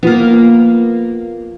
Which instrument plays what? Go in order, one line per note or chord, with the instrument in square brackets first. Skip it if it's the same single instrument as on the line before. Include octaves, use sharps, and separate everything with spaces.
[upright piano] F3 [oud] A#3 B3